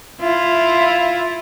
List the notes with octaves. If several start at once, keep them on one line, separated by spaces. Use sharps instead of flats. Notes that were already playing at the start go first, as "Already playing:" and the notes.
E4 F4